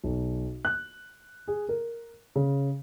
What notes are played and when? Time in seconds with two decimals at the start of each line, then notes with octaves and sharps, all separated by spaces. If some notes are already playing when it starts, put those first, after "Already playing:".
0.04 B1
0.65 F#6
1.48 G#4
1.69 A#4
2.36 C#3